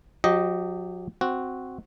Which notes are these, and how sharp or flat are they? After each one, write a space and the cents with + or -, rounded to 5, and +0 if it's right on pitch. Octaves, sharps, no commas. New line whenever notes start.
F#3 -45 G4 -10 D#5 +0
C4 +0 F#4 +0